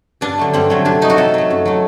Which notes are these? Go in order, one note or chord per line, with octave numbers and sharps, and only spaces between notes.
G2 D4
D3 F#3 A3
G2 C4
D3 F#3 A3
C3 D4
F#3 A3 D#4
F#4
C3 A4
F#3 A3
F#2
F#3 A3